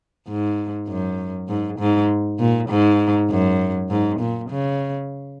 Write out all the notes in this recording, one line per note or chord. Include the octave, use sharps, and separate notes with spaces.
G#2
F#2
G#2
G#2
A#2
G#2
F#2
G#2
A#2
C#3